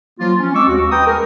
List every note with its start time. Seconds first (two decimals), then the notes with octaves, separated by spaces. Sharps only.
0.20 F3 F#3 A#3 F4
0.39 C#4
0.55 G#3 C4 C#6 D6 E6
0.68 D#2 F#4
0.91 G#3 B4 G5 A#5 D#6
1.06 G#4 A#4